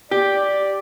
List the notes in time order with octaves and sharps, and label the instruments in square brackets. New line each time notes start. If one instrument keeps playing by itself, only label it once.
[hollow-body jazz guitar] G4 [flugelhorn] D5